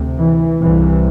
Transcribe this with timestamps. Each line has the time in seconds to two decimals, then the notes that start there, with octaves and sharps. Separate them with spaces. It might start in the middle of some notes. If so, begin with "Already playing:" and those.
Already playing: D2 C3
0.19 E3
0.62 C2 C3 E3